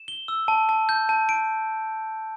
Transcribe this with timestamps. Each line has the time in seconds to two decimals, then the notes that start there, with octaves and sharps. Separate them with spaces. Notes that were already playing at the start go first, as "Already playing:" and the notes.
Already playing: E7
0.08 G7
0.28 E6
0.48 A5
0.69 A5
0.89 G6
1.09 A5
1.29 D7